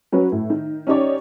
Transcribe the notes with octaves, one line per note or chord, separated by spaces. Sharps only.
F#3 C#4 B4
A2
D#3
C#4 D#4 G4 C#5 D5